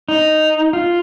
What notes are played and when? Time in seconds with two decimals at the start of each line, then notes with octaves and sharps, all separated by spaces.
0.08 D#4
0.73 F4